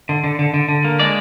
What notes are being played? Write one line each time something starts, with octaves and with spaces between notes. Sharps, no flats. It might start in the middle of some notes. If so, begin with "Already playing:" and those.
D3
D3
D3
D3
D3
A#3
G#3 D5